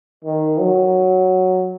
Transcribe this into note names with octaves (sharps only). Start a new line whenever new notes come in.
D#3
F#3